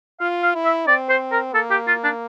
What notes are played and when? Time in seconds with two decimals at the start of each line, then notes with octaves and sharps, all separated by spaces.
0.20 F4 F5
0.43 F5
0.55 E4
0.65 E5
0.87 C4 D5
1.09 C5
1.32 A#4
1.54 A#3 A4
1.71 G4
1.88 F4
2.04 D4